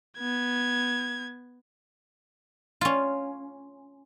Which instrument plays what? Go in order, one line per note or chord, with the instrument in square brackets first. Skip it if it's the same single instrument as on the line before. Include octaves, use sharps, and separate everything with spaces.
[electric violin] B3 G#6
[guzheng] C#4 F4